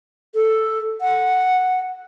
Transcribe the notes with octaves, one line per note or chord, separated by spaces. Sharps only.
A4
F#5